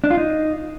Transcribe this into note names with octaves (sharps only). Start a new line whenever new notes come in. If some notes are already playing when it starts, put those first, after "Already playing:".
D4
F4
D#4